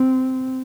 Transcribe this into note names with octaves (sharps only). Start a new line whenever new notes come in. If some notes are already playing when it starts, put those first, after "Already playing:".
Already playing: C4